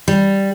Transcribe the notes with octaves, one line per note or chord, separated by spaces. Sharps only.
G3